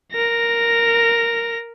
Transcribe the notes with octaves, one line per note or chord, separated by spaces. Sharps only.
A#4 A#6